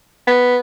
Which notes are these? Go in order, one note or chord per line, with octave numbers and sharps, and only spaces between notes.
B3